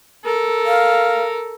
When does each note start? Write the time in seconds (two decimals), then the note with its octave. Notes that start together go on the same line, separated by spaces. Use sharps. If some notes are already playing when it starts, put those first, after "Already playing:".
0.24 A4 A#4
0.66 F5